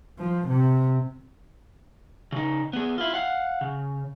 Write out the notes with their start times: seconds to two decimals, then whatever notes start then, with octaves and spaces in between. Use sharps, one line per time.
0.19 F3
0.48 C3
2.32 C#3 D#4
2.73 B3 G#4
2.98 E4 F4
3.14 F5 F#5
3.61 C#3